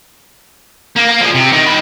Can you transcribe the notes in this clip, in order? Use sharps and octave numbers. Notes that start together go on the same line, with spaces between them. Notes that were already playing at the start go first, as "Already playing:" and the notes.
A#3
A#3
F3 G#4
C3
D#3
D#3 B5